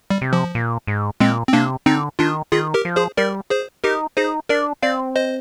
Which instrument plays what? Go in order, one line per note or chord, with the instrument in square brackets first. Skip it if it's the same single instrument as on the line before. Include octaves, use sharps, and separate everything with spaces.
[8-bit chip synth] G3
[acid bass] C3
[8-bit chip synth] F3
[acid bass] A#2
G#2
[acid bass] A#2 [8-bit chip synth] G#3 C4
[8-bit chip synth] C4
[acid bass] C3 [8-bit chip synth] A#3 D4
[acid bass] D3 [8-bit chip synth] C4 D#4
[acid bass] D#3 [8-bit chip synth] D4 F4
[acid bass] D#3 [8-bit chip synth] F4 G#4
[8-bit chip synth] G4 A#4
[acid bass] F3
[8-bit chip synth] G#4 C5
[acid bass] G3 [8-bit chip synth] A#4 D5
[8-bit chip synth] G#4 C5
[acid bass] D#4 [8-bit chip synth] G4 A#4
[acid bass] D#4 [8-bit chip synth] G#4 C5
[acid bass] D4 [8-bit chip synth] A#4 D5
[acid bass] C4 [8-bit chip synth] D5 F5
[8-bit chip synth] C5 D#5